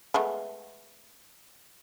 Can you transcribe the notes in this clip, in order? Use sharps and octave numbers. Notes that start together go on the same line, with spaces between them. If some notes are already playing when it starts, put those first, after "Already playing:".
G#3 A3 B3